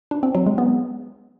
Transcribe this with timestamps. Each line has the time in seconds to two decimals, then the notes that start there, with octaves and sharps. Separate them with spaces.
0.11 D4
0.23 C4
0.35 F#3
0.46 G#3
0.58 B3